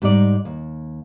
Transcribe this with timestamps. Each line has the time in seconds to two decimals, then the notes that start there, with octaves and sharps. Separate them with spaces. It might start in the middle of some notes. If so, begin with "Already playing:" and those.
0.02 G#2 G3 D#4 B4 D5
0.45 D#2